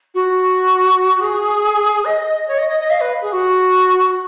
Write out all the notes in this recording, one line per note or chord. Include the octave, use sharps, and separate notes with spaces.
F#4
G#4
D#5
C#5
D#5
D#5
D#5
F5
B4
G#4
F#4